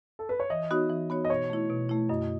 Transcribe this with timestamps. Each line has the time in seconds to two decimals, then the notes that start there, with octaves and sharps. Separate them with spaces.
0.19 A4
0.29 B4
0.40 C#5
0.50 E3 D#5
0.71 B3 D#4 F#4 C#5
0.90 E3
1.10 B3 D#4 F#4 C#5
1.25 D#5
1.29 B2 C#5
1.50 A3 E4
1.70 B2
1.89 A3 E4
2.09 F#2 D#5